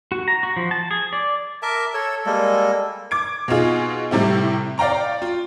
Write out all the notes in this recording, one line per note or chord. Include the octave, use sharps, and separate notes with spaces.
F#4
A#5
F#4
F3
A5
G#4
D5
A#4 E5 A5 D6
A4 C#5 E6
G3 G#3 A#3 A4
D6 G#6 D7
B2 D#4 F4 G#4
A2 C3 G3 E4
D5 F5 G5 A#5 C#6
F4